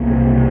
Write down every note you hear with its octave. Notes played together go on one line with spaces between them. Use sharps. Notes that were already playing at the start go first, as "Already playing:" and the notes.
Already playing: C2 A#3
C3
C3